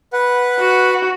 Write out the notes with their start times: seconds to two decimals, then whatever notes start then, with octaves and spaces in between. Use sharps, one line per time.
0.13 B4 F#5
0.59 F#4